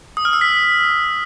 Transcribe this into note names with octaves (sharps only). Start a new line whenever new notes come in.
D#6
F6
E6
B6